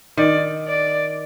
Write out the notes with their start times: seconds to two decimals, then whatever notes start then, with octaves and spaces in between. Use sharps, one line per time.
0.17 D#3 D5
0.68 D5